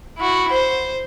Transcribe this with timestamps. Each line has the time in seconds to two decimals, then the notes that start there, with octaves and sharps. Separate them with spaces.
0.18 E4 F#4
0.52 C5